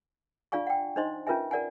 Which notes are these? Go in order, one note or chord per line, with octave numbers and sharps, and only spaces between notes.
D4 F4 D5 F5 G#5 C#6
F#5 G5
D4 D#4 C5 D#5 C6
C#4 F4 A#4 B4 E5 G#5
A#4 D5 F#5 G#5